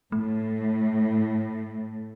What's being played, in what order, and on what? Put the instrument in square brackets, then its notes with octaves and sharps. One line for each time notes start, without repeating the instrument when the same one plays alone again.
[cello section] A2 [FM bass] A3